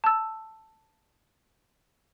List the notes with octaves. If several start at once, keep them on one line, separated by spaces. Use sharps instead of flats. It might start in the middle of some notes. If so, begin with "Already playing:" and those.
A5 E6